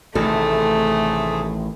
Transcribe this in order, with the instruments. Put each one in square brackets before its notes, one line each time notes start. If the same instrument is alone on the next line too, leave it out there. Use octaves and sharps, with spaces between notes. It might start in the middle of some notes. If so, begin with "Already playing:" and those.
[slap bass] A1 D#3 [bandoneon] C3 G#4 [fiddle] A3 [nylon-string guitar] A4